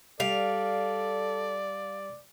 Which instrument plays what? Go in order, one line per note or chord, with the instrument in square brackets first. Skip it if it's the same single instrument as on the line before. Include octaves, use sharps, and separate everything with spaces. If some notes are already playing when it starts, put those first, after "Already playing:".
[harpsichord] G3 [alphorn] A4 [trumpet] D5 [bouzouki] F5